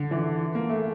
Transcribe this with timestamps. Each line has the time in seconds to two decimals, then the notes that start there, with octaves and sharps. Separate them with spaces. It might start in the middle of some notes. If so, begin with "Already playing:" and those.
Already playing: D3
0.11 E3
0.55 A#3
0.69 A3